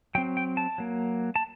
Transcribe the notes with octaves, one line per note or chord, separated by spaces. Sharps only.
F#3 C4 G5
G5
A5
F#3 A#3
A5